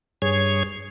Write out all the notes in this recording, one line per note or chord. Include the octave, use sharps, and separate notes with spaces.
G2 G#4 C#5 G#6